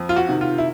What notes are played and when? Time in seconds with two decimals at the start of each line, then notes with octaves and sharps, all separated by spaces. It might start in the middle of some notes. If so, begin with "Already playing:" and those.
Already playing: F2
0.09 F4
0.16 F#4
0.29 C3 D#3
0.41 F4
0.58 E4